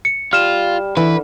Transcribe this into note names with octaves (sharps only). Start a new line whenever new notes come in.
C#7
G3 F4 F6 E7
D3 E3 B4